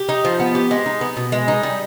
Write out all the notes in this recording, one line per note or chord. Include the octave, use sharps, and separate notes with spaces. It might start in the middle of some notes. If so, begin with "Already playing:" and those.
Already playing: G4
D#4
F3
B3
G4
G#3
D#4
B3
B2
G#3
D#4
G3